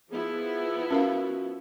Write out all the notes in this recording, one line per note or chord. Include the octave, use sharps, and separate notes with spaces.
F3 B3 E4 G#4
C#4 F#4 A#4 F5